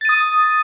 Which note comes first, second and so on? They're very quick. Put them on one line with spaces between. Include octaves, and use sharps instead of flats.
A6 D#7 D#6